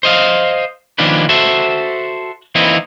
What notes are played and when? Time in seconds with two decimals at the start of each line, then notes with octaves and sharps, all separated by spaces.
0.03 C5 D#5 F5
0.98 D#3 F3 A#3 C#4 D4 B4
1.29 F#4 A4 C5 E5
2.55 E3 A#3 C4 D#4 E4